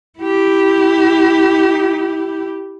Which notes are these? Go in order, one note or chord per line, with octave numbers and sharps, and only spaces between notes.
E4 G4